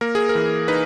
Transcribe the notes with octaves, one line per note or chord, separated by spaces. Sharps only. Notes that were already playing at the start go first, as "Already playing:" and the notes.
A#3 A#4
G#4
A#4
E3
D#4 B4